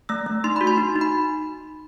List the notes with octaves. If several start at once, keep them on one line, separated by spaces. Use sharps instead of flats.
A3 E6
A3
D#4 C6
F#4 B5
C6
D#4
D#4
B5